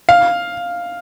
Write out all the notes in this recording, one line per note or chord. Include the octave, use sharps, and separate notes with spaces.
F5